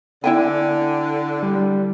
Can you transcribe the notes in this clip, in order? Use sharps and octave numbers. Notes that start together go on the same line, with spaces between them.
D3 E4 G5 G#5
G3